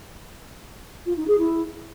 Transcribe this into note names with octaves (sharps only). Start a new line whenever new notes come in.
F4
D#4
G#4
E4